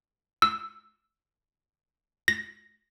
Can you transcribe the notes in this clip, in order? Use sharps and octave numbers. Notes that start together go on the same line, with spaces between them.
E6
A#6